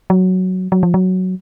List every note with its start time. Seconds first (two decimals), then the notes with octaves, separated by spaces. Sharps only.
0.10 F#3
0.72 F#3
0.83 F3
0.94 F#3